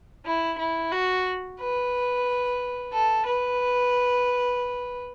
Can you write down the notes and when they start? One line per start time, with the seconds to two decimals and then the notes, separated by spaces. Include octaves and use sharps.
0.26 E4
0.59 E4
0.92 F#4
1.59 B4
2.93 A4
3.26 B4